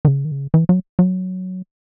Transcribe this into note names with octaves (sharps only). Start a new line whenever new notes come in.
D#3
C#3
D#3
C#3
E3
F#3
F#3